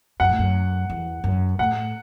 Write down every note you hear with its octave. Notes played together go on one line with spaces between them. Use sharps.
F#2 F#5
A2
F#2
E2
F#2
A2 F#5